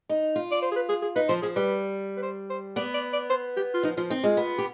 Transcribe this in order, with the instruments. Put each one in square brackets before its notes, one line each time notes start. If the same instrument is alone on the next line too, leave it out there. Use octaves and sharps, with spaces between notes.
[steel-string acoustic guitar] D#4
F4
[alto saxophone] D5
C5
G#4
B4
G#4
G#4
[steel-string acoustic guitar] D#4 [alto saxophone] B4
[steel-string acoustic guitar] F3 [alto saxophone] C5
[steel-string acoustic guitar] F3 [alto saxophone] G#4
[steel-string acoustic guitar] G3 [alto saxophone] B4
[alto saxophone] B4
C5
C5
[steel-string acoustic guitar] B3 [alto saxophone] D5
[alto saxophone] D5
D5
C5
G4
F4
[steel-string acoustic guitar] F3 [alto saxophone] D#4
[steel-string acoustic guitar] F3 [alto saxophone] F4
[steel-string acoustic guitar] C4 [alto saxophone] D#4
[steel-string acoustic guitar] G#3 [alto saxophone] F4
[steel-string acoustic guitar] B3
G4